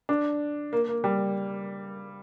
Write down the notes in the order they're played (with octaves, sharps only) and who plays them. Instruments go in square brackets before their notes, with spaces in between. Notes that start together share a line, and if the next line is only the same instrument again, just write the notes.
[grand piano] D4
A#3
A#3
G3